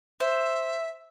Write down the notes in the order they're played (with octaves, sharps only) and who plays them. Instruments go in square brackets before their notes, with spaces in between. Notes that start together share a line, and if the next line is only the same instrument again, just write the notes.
[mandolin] C5 [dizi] E5